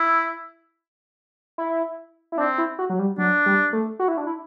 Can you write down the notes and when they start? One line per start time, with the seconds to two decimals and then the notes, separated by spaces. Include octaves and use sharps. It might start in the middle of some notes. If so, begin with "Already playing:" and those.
Already playing: E4
1.58 E4
2.32 E4
2.38 C4 D4
2.58 E4
2.79 F#4
2.90 F#3
2.99 G3
3.18 F#3 D4
3.46 G3
3.73 A3
3.99 F#4
4.08 E4
4.17 D4
4.27 E4